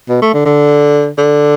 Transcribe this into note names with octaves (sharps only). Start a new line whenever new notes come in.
B2
A3
D3
D3
D3